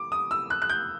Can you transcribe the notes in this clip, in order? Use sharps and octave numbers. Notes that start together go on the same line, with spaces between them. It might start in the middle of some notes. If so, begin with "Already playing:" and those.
Already playing: D6
D#6
E6
F#6
F#6
G6